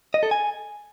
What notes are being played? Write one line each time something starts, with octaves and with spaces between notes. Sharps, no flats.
D#5
A4
G#5